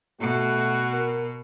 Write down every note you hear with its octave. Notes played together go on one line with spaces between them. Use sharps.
B2 A3 F#4
A#4